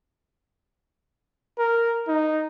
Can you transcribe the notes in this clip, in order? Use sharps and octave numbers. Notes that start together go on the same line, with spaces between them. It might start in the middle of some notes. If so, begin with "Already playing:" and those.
A#4
D#4